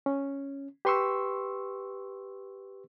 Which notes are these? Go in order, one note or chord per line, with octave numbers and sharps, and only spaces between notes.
C#4
G4 B4 C6 C#6 E6